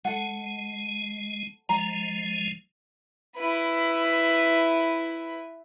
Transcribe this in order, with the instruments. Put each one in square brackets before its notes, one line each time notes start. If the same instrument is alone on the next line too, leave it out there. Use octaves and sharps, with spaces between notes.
[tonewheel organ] G#3 [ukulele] A4 F#5
[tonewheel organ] F3 G#3 [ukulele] A#5
[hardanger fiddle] E4 B4